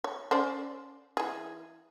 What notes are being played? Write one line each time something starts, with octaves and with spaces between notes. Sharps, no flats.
C#5
C#4 C5 D5
E3 G#4